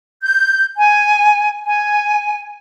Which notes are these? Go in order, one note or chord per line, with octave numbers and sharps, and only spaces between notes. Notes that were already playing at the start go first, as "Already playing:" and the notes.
G6
G#5
G#5